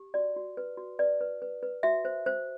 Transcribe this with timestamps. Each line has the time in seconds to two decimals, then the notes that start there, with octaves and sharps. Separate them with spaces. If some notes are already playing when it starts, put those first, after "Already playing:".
Already playing: G4
0.14 F#4 D5
0.36 F#4
0.57 B4
0.77 F#4
0.99 B4 D5
1.21 B4
1.42 B4
1.63 B4
1.83 F#4 E5
2.05 C5
2.26 C5